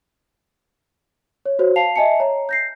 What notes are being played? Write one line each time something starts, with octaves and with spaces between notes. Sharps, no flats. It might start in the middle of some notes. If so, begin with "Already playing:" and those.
C#5
F#4 C5 C#5
F5 A5 C7 F7
D#5 E5 G#5 A5 C#7
C#5 A#5
G6 A#6 C7